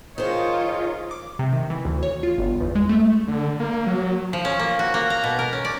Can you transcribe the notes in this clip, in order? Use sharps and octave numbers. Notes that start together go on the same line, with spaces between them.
D#3 F4 G#4 A#4 C5 C#5 D#5
D6
C3
D#3
E3
D2
C#5
F4
G1
E2
G#3
A3
D3
A#3
F#3
F3
C#4
A#3
F#4
A#3
A#5
B2
A#4
C#4
D5